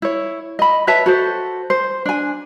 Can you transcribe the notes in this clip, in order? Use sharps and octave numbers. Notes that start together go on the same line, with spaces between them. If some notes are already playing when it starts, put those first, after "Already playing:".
E4 C#5
D#5 B5
B4 C#5 E5 A5
F#4 A4 C5
C5
D4 G#5